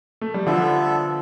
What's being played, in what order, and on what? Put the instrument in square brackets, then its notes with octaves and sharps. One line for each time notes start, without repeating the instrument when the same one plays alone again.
[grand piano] A3
G3
[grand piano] D3 F3 [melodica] B3 D4 A4 E5